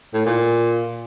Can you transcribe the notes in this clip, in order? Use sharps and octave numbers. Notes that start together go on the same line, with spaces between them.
A2
A#2